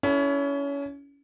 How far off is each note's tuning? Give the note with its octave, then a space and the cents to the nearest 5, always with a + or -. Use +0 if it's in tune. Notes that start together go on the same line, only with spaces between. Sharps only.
C#4 +25 E4 +0 A4 +0